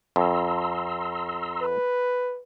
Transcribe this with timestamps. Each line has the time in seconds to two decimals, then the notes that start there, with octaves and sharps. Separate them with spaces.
0.16 F2 A#5 C6 E6
1.62 B4